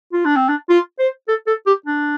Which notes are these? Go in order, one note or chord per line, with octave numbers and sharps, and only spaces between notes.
F4
D4
C4
D4
F4
C5
A4
A4
G4
D4